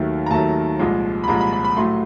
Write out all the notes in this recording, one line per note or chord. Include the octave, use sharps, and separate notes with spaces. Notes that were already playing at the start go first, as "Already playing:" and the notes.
Already playing: D#2 D#3 F#3 A3
A#5
D#2 D#3 F#3 A3 A5
C2 A#2 F3 G#3
B5
C2 A#2 F3 G#3 A#5
B5
B5
B5
A2 F#3 A3 C6